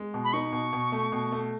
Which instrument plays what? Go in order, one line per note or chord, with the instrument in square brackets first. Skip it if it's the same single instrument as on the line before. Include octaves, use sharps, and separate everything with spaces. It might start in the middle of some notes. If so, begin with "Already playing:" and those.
Already playing: [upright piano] G#3
B2
[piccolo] B5
[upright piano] D#4 [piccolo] C#6
[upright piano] B2
B2
A3
B2
A3